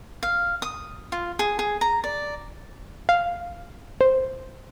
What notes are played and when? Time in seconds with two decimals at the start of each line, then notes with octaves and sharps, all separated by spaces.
0.23 F5
0.62 D#6
1.12 F4
1.39 G#4
1.59 G#4
1.81 A#5
2.04 D5
3.09 F5
4.01 C5